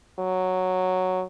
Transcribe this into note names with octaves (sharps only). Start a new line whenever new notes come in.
F#3